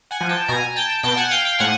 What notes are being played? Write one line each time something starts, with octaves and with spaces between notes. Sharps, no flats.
F#5 G#5
F3
G5 A5
B2 G#5 A#5
G5 A5
B2 G5 A5
F#5 G#5
F5 G5
F5 G5
A2 F#5 G#5